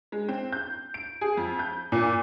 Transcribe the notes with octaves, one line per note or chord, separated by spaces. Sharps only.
G#3
C4
G6
D7
G#4
F2
G6
A#2